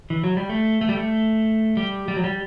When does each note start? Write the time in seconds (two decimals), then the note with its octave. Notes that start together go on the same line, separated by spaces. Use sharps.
0.10 E3
0.24 F#3
0.37 G3
0.49 A3
0.81 A3
0.89 G3
0.97 A3
1.77 G3
2.08 G3
2.16 F#3
2.24 G3